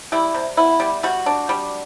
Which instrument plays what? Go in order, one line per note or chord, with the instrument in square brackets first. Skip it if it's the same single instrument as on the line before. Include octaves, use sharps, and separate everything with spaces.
[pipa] G3 E4
C3
B3 E4
G3
G3 F#4
D4
G3